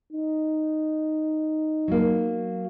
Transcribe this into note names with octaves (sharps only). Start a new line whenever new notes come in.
D#4
F#3 A#3